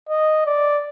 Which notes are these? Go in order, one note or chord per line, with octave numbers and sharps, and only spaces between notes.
D#5
D5